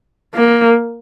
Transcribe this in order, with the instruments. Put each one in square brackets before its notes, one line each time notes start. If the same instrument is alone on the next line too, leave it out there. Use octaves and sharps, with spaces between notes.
[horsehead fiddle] A#3